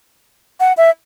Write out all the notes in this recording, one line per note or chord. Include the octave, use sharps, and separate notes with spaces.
F#5
E5